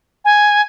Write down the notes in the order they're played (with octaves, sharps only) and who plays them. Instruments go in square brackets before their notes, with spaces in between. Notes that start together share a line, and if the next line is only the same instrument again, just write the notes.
[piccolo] G#5